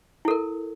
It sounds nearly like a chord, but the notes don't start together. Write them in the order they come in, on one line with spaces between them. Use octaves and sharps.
E4 A4 A#4